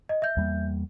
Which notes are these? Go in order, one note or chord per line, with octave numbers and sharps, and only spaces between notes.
D#5
E5 G6
E2 G3 A#3